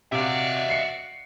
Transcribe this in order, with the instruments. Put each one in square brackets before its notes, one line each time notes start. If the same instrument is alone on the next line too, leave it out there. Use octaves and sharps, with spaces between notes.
[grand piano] C3 [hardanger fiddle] F#4 D5 [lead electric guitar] E5 F5
[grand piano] C7 C#7